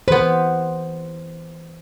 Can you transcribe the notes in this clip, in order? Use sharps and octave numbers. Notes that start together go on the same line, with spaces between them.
E3 B3 B4 C5